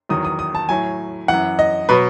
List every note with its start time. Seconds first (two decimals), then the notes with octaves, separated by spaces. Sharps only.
0.09 E2 D#3 F#3 D#6
0.25 D#6
0.39 D#6
0.55 A5
0.69 A2 F#3 G#5
1.28 F#2 E3 F#5
1.59 D#5
1.89 B2 F#3 B4